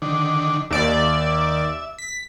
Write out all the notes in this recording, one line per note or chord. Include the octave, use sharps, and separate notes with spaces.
D3 D#3 D4
D#2 D5 E5
B6